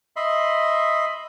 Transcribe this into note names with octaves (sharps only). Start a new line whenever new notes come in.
D#5 E5 B5 C6